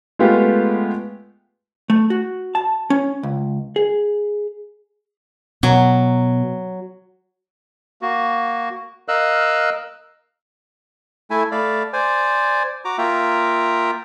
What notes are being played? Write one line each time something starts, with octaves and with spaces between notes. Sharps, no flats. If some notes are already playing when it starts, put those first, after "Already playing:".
G#3 A3 B3 F4 G4
A3
F#4
A5
C#4
C#2
G#4
B2 F#3
A#3 F#4
A#4 D#5 F5 E6 F#6
A3 E4 E5 G#5
A3 D5 F5 B5
C5 D5 G#5
F#4 A#5 D6
A#3 F4 E5 G5 A#5